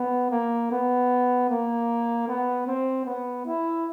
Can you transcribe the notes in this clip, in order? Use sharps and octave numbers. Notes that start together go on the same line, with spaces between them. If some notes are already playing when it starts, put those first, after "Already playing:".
Already playing: B3
A#3
B3
A#3
B3
C4
B3
E4